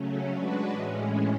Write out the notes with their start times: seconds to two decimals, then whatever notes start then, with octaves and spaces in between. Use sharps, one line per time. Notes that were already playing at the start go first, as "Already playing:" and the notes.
Already playing: C#3 F#3 A3 C#4
0.30 G#3 D4 F#4 B4
0.70 A2 E3 G#3 C#4